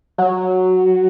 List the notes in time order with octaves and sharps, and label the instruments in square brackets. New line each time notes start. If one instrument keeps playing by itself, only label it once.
[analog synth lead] F#3